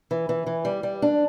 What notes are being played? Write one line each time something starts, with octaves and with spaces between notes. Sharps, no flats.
E3
E3
E3
G3
G3
D4